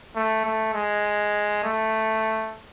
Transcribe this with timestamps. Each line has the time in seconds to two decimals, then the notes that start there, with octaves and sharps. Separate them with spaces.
0.16 A3
0.45 A3
0.74 G#3
1.64 A3